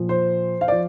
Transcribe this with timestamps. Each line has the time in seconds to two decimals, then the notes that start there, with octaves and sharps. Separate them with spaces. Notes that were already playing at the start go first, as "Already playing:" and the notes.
Already playing: A#2 F3
0.09 C5
0.61 F5
0.68 F3 D5